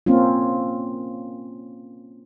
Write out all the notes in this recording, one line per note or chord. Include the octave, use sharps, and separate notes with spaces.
A#3 C4 C#4 F4